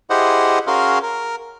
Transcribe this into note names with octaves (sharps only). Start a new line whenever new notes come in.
E4 G4 G#4 C5 D#5 F#5
C#4 F#4 G#4 A#4 F5 C6
A#4